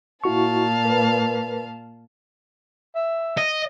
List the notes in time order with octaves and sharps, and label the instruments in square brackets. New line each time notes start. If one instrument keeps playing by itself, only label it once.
[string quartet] A#2 F5 A5 [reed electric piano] E4 F#4 C#6
[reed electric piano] A#4 B4
[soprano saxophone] E5
[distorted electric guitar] D#5